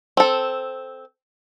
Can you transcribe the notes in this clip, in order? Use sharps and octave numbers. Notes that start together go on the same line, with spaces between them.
C4 A4